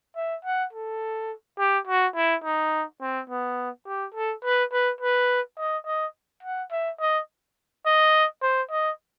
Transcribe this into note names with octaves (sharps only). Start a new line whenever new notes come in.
E5
F#5
A4
G4
F#4
E4
D#4
C4
B3
G4
A4
B4
B4
B4
D#5
D#5
F#5
E5
D#5
D#5
C5
D#5